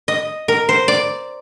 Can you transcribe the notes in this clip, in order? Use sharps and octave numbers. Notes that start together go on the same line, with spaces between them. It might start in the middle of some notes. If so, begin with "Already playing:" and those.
D#5
A#4
C5
D5